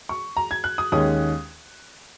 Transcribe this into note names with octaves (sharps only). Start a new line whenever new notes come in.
C#6
A#5
G#6
F#6
D#6
D#2 D#3 G#3 C#4 D#6